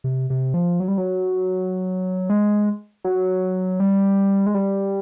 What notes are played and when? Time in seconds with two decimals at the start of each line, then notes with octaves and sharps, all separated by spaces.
0.04 C3
0.30 C3
0.54 F3
0.80 F#3
0.88 G3
0.98 F#3
2.30 G#3
3.04 F#3
3.80 G3
4.47 G#3
4.54 G3